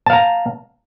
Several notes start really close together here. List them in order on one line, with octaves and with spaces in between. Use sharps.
A5 F5 A#5